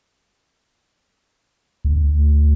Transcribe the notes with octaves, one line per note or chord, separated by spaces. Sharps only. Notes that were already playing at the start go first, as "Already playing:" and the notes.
D2